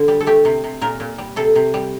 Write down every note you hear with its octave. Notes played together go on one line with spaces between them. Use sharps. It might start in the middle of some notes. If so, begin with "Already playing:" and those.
Already playing: D3
G3
A4
A3 G4
C3
C3
A#2 A#4
A#2
G3
C3 A4
C3
G3